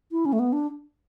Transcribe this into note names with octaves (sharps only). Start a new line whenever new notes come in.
E4
C#4
A3
B3
D4